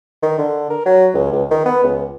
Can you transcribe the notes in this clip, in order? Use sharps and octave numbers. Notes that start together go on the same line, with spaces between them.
D#3
D3
A#4
F#3
C#2
C#2
D#3
B3
C#2